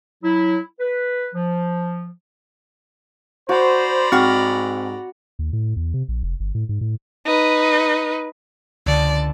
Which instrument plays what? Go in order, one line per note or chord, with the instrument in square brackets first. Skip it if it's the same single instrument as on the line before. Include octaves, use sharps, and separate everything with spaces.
[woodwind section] F#3 E4
B4
F3
[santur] F#4 [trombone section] C5 [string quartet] D5 A#5 B5
[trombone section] G#2 [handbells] C4 G5 F6 [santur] F#4
[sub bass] D#2
A2
E2
C3
A#1
F1
G1
A2
G#2
A2
[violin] D#4 B4
[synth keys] C#2 D3 [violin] D5 A5